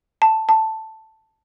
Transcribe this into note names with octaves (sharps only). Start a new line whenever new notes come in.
A5
A5